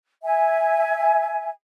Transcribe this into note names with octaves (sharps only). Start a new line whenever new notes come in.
E5 G#5